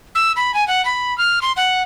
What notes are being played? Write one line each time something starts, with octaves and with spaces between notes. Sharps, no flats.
E6
B5
G#5
F#5
B5
F6
C6
F#5